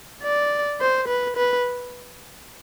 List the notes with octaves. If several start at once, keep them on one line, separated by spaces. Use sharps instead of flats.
D5
C5
B4
B4